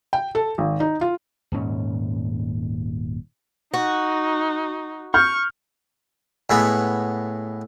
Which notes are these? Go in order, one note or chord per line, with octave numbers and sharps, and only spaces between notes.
G5
A4
G#1
D#4
F4
D#1 G#2 C#4
D#4 F#4
C#6 F6 G6
A2 G#3 B3